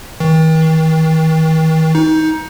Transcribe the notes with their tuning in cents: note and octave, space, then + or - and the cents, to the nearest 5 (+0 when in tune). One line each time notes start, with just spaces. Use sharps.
D#3 +45
D#4 +20